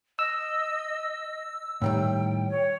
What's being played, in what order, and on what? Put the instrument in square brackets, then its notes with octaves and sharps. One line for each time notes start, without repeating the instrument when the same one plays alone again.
[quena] D#5 [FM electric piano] E6
[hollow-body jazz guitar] A2 D#3 G3 [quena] G5
[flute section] C#5